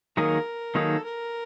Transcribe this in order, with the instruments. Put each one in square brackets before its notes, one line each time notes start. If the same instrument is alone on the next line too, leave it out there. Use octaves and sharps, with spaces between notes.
[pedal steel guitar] D#3 F#3 A#3 D#4 G#4 [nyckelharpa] A#4
[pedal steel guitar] D#3 F#3 A#3 D#4 G#4 [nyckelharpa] A4
[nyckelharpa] A#4